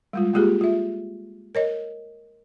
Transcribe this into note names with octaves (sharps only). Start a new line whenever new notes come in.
G3 G#3 F4
G#3 A#3 F4 G4 G#4
F4 E5
A#4 C#5 D#5